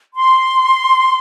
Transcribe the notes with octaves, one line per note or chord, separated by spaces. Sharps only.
C6